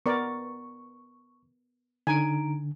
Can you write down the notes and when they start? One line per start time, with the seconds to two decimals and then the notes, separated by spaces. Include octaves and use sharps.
0.06 B3 A#4 D5 C#6
2.07 D3 D#4 G#5 A#5 D7